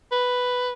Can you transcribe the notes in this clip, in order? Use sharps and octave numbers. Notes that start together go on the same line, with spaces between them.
B4